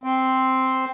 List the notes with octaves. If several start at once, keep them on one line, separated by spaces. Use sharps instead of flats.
C4